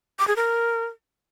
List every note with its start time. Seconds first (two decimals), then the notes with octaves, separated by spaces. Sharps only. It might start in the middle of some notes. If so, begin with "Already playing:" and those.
0.19 D6
0.28 G#4
0.36 A#4